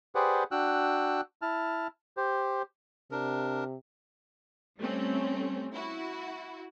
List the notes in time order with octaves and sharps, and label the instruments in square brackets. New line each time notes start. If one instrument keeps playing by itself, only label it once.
[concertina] G4 G#4 B4 C5 D5 F#5
D4 F#4 G5 E6 F#6
E4 A5 F6
G4 C5
[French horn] C3 [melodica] D4 A#4
[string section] G3 A3 C4 C#4
E4 F#4